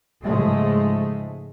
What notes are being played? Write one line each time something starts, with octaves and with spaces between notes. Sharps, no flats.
G#2 C#3 F3 G#3 A3